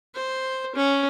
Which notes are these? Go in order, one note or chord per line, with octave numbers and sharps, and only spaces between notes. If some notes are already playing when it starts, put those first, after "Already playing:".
C5
C#4